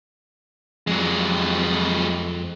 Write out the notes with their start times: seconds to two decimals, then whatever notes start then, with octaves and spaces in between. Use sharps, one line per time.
0.87 F2 F#3 G#3